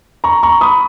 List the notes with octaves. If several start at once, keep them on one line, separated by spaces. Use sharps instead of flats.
A#5 C#6
A#5 C#6
B5 D#6